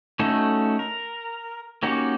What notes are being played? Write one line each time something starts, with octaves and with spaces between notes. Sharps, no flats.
A3 C#4 D#4 F#4 A4
A#4
A#3 C#4 D#4 F#4 G4